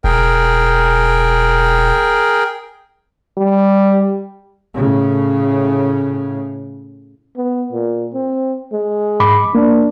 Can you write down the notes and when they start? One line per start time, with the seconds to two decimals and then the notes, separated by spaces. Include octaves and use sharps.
0.04 E1 G#4 A#4 G5
3.38 G3
4.74 A2 C#3
7.37 B3
7.72 A#2
8.14 C4
8.72 G#3
9.20 G#2 B5 D6
9.55 A#3 D4